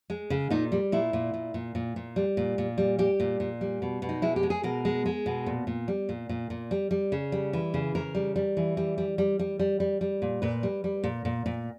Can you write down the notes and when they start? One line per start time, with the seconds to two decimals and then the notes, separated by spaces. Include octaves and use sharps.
0.10 G#3
0.30 C#3
0.50 A#2 D#4
0.72 G3
0.92 A#2 E4
1.13 A#2
1.34 A#2
1.54 A#2
1.75 A#2
1.96 A#2
2.16 G3
2.37 A#2
2.58 A#2
2.78 G3
2.99 G3 G4
3.20 A#2
3.40 A#2
3.61 G3
3.82 B2
4.02 B2
4.09 D#4
4.22 G#3 E4
4.36 G4
4.43 G#3
4.50 G#4
4.63 B2 A#4
4.85 G#3
5.06 G#3
5.26 B2
5.46 A#2
5.67 A#2
5.88 G3
6.09 A#2
6.29 A#2
6.50 A#2
6.71 G3
6.91 G3
7.12 C#3
7.32 G3
7.53 E3
7.74 C#3
7.95 C#3 A#4
8.15 G3
8.36 G3
8.57 E3
8.77 G3
8.98 G3
9.18 G3
9.39 G3
9.59 G3
9.80 G3
10.01 G3
10.22 A#2
10.42 A#2 B4
10.63 G3
10.84 G3
11.04 A#2
11.25 A#2
11.46 A#2